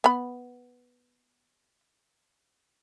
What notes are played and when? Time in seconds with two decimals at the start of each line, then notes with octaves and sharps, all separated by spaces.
0.04 B3 B5